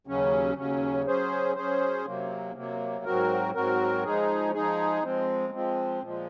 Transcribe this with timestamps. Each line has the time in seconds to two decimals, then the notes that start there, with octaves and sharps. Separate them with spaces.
0.07 D#2 C#3 F#3 C#4
0.56 D#2 C#3 F#3 C#4
1.06 F#3 C#4 G#4 C5
1.56 F#3 C#4 G#4 C5
2.06 C3 F#3 A#3
2.55 C3 F#3 A#3
3.05 G#2 F#3 C4 F#4 A#4
3.54 G#2 F#3 C4 F#4 A#4
4.04 F3 G#3 D#4 G#4
4.54 F3 G#3 D#4 G#4
5.03 F3 G#3 C4
5.53 F3 G#3 C4
6.03 A#2 F3 G#3